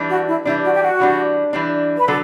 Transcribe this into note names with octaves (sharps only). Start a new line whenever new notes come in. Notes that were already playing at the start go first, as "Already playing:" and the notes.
Already playing: E3 G3 D4
F#4
E4
E3 G3 D4 E4
F#4
G4
F#4
E3 G3 D4
E3 G3 D4
B4
D3 F#3 A4